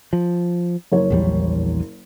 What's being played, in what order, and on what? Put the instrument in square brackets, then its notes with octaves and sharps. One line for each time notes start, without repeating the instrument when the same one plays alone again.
[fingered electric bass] F3
[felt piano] F#1 A#4 C#5
[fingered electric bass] A#1 E2 G3